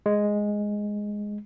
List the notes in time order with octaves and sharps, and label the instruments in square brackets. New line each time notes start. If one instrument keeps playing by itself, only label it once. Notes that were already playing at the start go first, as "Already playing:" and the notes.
[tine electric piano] G#3